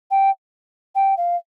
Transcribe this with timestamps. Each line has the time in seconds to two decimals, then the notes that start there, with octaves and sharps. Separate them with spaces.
0.11 G5
0.95 G5
1.17 F5